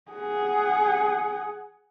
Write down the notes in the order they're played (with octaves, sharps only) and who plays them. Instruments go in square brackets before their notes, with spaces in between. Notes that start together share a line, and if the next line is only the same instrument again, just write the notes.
[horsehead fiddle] G#4 F#5